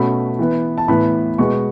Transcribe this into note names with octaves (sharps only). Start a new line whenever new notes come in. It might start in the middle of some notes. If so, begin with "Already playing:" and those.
Already playing: B2 A3 C#4 B5
E3 B3
A5
A2 E3 B3 B5
B2 G#3 B3 C#6